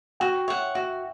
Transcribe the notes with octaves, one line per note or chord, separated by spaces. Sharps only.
F#4 G5
C#5 E5 F#5
F#4 E5